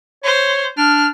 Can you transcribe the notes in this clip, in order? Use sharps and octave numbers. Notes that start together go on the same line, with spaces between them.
C5 C#5
D4 F6